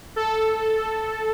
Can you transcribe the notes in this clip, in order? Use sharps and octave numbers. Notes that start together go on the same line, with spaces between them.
A4